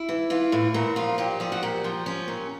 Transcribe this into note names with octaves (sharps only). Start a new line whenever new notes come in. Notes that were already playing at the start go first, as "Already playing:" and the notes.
Already playing: E4
E3
E3 F4
A2
A#2 F#4
F3 F4
A#2 G4
F3 G#4
F#4
A#2 G4
F3
F3 C#4
A#2